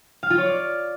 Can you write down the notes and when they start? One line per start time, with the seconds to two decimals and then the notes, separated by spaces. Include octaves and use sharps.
0.23 F5
0.30 F4
0.38 C#5
0.45 D5